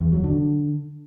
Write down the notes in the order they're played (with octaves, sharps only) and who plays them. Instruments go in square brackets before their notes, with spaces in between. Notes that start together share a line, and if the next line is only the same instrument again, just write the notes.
[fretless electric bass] E2
F#3
D3